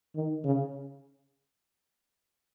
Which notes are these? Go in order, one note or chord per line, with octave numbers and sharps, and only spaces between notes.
D#3
C#3